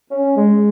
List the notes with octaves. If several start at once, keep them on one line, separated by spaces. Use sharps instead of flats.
C#4
G#3